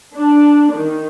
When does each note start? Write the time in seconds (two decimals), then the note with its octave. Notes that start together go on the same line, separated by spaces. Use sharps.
0.16 D4
0.73 D#3